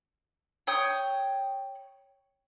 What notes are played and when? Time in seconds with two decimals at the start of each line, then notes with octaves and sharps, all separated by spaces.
0.67 C#5 G5 D#6 G6